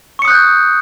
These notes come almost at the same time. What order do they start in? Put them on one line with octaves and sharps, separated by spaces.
C#6 C#7 D#6 F#6 G6